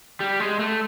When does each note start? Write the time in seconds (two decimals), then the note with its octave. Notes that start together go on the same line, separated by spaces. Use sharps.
0.21 G3
0.40 G#3
0.59 A3